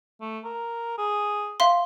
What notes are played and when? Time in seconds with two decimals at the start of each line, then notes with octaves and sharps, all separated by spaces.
0.21 A3
0.44 A#4
0.98 G#4
1.60 E5 F5 C6